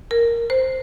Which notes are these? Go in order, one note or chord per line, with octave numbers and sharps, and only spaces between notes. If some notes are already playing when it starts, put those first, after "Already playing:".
A#4
C5